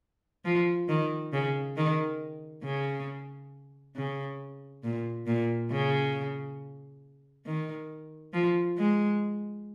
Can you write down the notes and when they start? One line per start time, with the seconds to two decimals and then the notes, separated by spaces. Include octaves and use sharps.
0.45 F3
0.89 D#3
1.33 C#3
1.77 D#3
2.64 C#3
3.96 C#3
4.84 A#2
5.27 A#2
5.71 C#3
7.46 D#3
8.34 F3
8.78 G#3